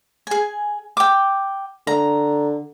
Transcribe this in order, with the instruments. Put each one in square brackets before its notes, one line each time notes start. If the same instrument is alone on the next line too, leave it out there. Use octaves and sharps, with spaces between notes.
[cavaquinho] G#4 G#5
G5 D6
[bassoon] D3 [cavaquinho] A#5